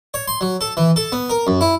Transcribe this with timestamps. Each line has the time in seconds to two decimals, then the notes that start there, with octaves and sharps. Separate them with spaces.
0.14 C#5
0.28 C6
0.41 F#3
0.61 A4
0.77 E3
0.96 A4
1.12 B3
1.30 A#4
1.47 F#2
1.61 E4